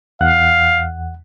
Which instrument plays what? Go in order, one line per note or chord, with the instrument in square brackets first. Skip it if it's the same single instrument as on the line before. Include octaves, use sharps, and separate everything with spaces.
[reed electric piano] E2 F#5 F#6 [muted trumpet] F5